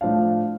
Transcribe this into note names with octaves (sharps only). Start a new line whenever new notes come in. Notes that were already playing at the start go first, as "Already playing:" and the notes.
A2 F3 A3 D4 F5